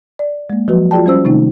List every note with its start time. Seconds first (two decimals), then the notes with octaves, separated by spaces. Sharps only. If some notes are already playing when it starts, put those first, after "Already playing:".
0.19 D5
0.50 G#3 A#3
0.68 F3 F#3 F#4 B4
0.91 F4 F#4 G#4 D5 G5 A5
1.06 G3 C#4 C5 E6
1.25 C3 D#3 A3 C4 D#4